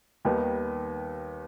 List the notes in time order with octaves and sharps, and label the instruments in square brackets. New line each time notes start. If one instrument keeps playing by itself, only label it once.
[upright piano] D#2 D#3 G3 B3